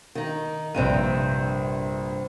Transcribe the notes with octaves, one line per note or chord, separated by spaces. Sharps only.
D#3 D#4
A#1 G2 C3 C4 D#7